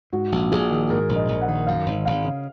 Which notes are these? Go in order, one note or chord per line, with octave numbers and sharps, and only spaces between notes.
G#2 F#4
A#1
A#1 G#4
D#3
G#2 A#4
A#1
D#5
A#1
F#5
D#3
F#2 F5
G#1
G#1 F5
C#3